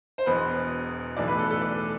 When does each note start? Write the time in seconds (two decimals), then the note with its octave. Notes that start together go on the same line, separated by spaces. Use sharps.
0.18 C5
0.26 E1 E2 B2 B4
1.17 B1 A2 E3 D5
1.28 B4
1.39 A4
1.51 A4
1.61 D5